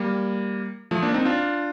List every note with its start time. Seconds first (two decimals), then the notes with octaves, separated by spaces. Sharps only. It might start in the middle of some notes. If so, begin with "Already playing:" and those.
Already playing: G3 A#3
0.91 F3 A3
1.02 A#3 D4
1.14 C4 D#4
1.25 D4 F4